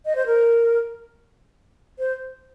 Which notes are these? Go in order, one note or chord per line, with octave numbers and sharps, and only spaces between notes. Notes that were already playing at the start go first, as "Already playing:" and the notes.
D#5
C5
A#4
C5